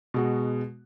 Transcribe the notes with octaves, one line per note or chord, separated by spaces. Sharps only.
B2 G#3 F#4